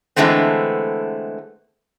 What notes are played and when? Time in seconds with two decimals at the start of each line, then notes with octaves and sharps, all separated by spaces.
0.16 D3 E3 G#3 A3 B3 C4